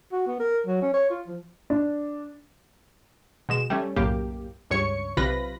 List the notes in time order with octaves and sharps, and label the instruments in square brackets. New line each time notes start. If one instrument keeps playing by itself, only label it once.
[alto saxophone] F#4
B3
A#4
F#3
C#4
C#5
F4
F3
[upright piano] D4
[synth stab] B2 G#3 E7
G3 A3 C#4
B1 F#2 A2 A#3 G4
C#2 G2 C#5 C#6 C#7
B1 C3 F4 B4 B5 A#6